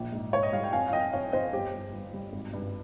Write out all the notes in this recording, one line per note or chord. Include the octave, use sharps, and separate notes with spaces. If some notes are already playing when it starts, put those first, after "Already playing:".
Already playing: A#1
G#2
G#2 C#5
D#5
G3 F5
G5
F2 F5 G#5
F5
F2 D#5 G5
F2 C#5 F5
F2 C5 D#5
G1 G4
G1
G1
G3
G#1
G2